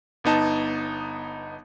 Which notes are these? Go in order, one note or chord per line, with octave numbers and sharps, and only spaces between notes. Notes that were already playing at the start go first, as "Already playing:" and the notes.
G1 B3 D#4 A5